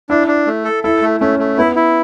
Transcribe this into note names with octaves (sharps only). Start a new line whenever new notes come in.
D4 E4
D4
A3
A4
E4 A4
A3
A3 C#4
A3
B3 E4
E4